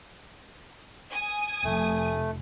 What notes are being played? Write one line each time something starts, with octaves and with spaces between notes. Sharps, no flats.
G#5 D#6
F1 A3